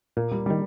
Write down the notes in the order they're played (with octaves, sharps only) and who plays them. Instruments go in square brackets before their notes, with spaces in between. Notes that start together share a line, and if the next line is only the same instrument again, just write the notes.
[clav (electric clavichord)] A#2 [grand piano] A#3
[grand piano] G3
[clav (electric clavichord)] D#3 [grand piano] G3